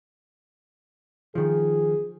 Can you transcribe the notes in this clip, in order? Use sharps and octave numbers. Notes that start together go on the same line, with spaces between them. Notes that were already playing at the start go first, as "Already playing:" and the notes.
D#3 F3 G#4